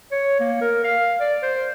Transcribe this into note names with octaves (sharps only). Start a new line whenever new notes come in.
C#5
A#3
A#4
F5
D5
C5